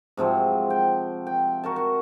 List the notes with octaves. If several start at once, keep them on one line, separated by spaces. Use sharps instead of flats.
G#2 C3 F3 F#3
G5
G5
F#4 A#4 A5
F#4